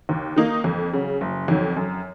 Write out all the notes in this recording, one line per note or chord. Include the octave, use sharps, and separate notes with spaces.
D#2
D#3 A#3 D#4
F2
C#3 F#3
F#1
F2 D#3 F#3
F#2